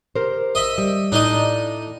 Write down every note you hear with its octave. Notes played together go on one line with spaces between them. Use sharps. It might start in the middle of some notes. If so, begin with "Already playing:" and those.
G4 A#4 C5
D#5 E5
G3
A2 D4 D#4 D#5